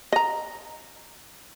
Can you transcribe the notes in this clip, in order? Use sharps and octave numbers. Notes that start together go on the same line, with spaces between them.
D#5 A#5